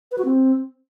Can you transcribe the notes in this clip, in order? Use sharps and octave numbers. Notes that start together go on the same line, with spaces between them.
B4
F#4
C4